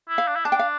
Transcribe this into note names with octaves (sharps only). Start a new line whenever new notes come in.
E4
F5
D4
E4
D4 A5
G5
F5